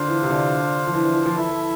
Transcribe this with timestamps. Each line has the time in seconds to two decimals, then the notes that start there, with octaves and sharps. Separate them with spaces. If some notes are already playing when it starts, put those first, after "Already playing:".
Already playing: D3 D4 F4 C5 F5
0.08 E3
0.23 C3
0.30 D3
0.87 F3
0.93 E3
1.04 E3
1.14 E3
1.26 F3
1.36 E3 E4 A4 E5
1.49 E3